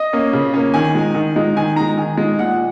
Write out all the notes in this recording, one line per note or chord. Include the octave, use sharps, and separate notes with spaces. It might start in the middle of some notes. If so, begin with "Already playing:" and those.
Already playing: D#5
A#3 C#4
C#3
A#3 C#4
D#3 G#5
G#3 D#4
D#3
G#3 D#4
D#3 G#5
G#3 D#4 A#5
D#3 G#5
G#3 D#4
A#2 F#5